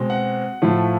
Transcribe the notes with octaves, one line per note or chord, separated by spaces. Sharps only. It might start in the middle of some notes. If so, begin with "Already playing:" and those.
Already playing: B2 G#3 C4
F#5
A2 F3 A3